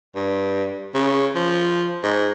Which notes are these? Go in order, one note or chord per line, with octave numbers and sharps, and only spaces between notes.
G2
C#3
F3
G#2